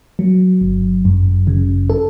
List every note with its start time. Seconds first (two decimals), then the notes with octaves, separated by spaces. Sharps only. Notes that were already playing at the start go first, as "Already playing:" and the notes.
0.19 F#3
0.61 G1
1.05 F#2
1.47 C#3
1.90 A4